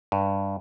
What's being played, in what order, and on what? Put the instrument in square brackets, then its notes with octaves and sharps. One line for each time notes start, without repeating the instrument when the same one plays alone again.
[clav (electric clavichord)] G2